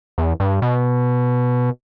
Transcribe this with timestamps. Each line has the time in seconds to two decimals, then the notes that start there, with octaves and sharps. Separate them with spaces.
0.18 E2
0.40 G2
0.62 B2